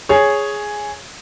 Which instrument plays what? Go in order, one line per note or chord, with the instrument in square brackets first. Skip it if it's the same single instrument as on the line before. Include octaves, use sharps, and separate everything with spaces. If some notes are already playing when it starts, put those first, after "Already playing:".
[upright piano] G#4 C#5